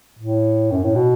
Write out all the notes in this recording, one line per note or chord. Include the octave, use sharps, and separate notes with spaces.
A2
F#2
A2
B2